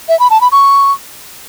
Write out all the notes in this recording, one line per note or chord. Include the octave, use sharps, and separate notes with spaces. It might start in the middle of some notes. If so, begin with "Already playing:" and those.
E5
B5
A5
B5
C#6